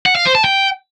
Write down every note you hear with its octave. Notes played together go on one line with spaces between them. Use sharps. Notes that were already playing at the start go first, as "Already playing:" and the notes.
F#5
F5
C5
A5
G5